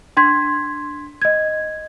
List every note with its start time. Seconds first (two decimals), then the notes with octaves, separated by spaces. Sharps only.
0.17 D4 C6 G#6 B6
1.22 D#5 G#6